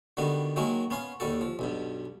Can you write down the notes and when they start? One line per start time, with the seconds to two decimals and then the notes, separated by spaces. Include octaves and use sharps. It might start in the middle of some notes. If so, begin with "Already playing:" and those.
0.17 D3 D#3 G3 B3 F#4
0.56 D#3 F#3 G#3 A#3 F#4
0.91 B3 C#4 F5 C6
1.20 D#2 G3 F#4 A4
1.41 F3
1.59 B1 G2 B2